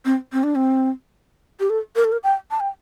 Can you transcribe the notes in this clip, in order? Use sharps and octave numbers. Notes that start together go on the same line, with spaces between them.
C4
C4
D4
C4
G4
A4
A#4
A4
A#4
G5
A5
G5